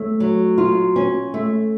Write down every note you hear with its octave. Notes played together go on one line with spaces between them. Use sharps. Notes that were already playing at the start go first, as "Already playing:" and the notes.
Already playing: A3 C#4
F#3
F4
C#4
A3